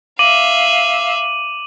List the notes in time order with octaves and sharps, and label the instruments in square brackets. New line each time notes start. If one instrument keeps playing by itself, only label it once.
[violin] E5 F5 [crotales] D6 D#7 F#7